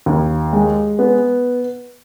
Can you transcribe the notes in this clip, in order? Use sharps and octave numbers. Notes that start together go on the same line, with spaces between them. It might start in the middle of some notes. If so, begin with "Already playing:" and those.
D#2
G#3
B3